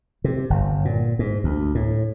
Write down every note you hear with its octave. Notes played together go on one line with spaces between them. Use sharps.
C3
G1
A#2
G#2
D2
A2